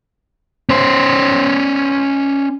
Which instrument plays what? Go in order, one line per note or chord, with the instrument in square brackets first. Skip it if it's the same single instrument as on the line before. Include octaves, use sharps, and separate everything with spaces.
[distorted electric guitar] C#4 C5